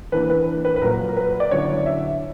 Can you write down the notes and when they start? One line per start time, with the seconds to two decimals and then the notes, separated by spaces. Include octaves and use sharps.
0.12 E3 A#3 D4 B4
0.30 B4
0.65 B4
0.76 B4
0.82 A#2 F#3 A#3 A#4
1.09 A#4
1.17 B4
1.40 D5
1.51 D3 F#3 C#4 E4 C#5
1.86 E5